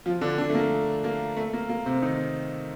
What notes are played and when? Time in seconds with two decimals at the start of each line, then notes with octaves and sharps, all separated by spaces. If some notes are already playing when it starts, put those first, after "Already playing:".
0.06 F3 F4
0.21 D3 D4
0.38 D3 D4
0.50 A3
0.55 A#3
1.04 A#3
1.37 A3
1.53 A#3
1.69 A#3
1.85 C3 C4
2.02 D#3 D#4